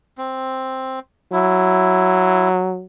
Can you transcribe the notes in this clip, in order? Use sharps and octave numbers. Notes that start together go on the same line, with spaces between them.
C4
F#3 E4